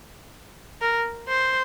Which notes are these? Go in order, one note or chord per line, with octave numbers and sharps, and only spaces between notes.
A#4
C5